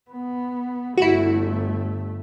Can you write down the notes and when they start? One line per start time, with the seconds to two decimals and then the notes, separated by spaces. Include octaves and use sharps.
0.11 B3
0.97 G1 A3 E4 F#4